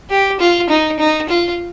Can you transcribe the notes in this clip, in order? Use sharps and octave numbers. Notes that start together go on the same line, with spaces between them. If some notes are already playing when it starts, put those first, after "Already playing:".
G4
F4
D#4
D#4
F4